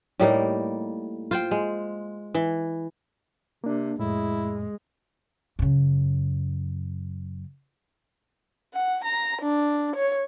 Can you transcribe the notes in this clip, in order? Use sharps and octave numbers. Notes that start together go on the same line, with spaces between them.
A2 G3 A#3 D#4
F4 C5 G5
G#3
E3
C3 A#3 D4
F2 A2 G#3 E4
F#2 C#3
F#5
A#5
D4
C#5